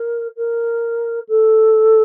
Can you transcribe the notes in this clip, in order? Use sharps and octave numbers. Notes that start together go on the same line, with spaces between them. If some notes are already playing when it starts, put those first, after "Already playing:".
Already playing: A#4
A#4
A4